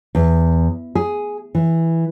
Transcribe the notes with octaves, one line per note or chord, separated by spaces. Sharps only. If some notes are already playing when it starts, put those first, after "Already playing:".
E2
G#4
E3